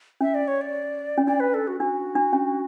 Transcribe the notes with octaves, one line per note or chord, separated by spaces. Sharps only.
C#4 E5
D5
C#5
D5
C#4
D4 D5
B4
A4
F#4
D4 F#4
D4
C#4